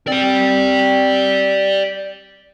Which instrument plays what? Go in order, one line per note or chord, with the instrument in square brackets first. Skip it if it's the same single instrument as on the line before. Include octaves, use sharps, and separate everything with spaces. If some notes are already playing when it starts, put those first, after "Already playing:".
[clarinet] C4 [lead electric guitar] D5 G5